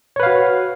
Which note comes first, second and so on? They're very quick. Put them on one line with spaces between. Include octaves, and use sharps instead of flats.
C#5 B4 F5 F#4